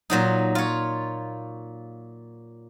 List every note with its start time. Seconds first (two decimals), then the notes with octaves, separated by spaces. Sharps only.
0.10 A#2 F#3 D#4
0.55 F4 C#5